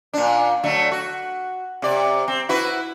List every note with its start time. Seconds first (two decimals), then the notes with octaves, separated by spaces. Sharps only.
0.14 A#2 D4
0.64 D3 F#3 A3
0.92 F#4
1.82 C3 D5
2.28 C4
2.49 E4 F#4 B4